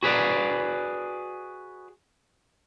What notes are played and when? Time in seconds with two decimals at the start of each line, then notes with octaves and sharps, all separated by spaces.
0.03 F#4 G#4 B4 D5